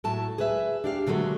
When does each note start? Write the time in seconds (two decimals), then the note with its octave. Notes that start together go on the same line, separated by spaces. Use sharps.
0.04 A2 F#3 A3 A5
0.38 G#4 B4 E5
0.84 D4 G4 F5
1.07 A#2 D3 F#3 G#3 A3